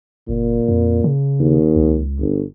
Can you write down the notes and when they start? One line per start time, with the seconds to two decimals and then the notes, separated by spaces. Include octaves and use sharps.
0.29 F#1 A#2
0.68 F2
1.04 C#3
1.40 D#2
1.76 C#2
2.20 G1